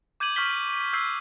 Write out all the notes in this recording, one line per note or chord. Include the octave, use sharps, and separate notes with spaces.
D6 G6 G#6 D#7 F#7
C#6 F6 G6 B6 G7
E6 G6 G#6 C7